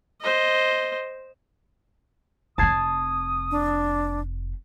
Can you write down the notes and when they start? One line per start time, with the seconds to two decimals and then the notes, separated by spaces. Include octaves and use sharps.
0.21 C5 D#5
2.58 F1 C4 A5 D#6 G#6 C7
3.51 D4